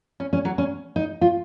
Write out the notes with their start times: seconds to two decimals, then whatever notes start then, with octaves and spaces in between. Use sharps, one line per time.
0.20 C#4
0.33 C#4
0.45 F#3
0.58 C#4
0.96 D#4
1.21 F4